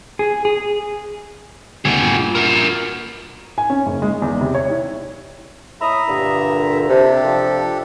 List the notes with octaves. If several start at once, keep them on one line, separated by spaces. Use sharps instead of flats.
G#4
G#4
D2 B2 F#4 G#4
G2 A#2
F#4 A#4
G#5
C#4
F#1
G#3
E2
C3
C#5
E4
A2 E5 A#5 B5 D#6
G2 A#2 D3
C3 D4 G4 A4
C3 F3